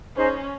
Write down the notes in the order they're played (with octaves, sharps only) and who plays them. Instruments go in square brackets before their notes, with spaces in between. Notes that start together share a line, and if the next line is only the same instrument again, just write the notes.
[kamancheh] C#4 [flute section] D#4 G#4 C5 D#5